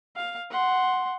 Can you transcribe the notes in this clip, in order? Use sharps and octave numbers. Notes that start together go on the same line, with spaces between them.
F5
F#5 C6